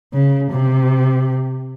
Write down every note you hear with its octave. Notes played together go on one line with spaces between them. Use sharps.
C#3
C3